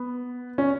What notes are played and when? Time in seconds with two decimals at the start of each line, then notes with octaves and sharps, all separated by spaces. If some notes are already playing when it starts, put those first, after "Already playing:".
Already playing: B3
0.58 C#4